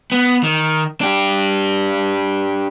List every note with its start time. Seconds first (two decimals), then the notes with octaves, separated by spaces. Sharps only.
0.12 B3
0.44 D#3
1.01 D4 G4